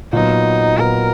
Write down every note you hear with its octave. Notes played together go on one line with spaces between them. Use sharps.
A#2 F#3 B3 D#4
A#2 F#3 B3 A#4